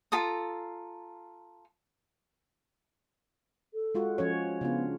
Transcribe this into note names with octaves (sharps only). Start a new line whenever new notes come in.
F4 A4 A#5 D#6
A4
G#3 F4 F#4
F3 C#4 C#5
C#3 B3 D4 F4